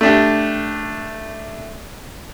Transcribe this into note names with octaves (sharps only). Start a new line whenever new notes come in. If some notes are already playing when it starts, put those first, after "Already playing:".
A3 D4 G4